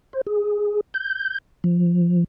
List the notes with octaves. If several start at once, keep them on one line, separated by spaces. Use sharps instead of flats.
C5
G#4
G6
F3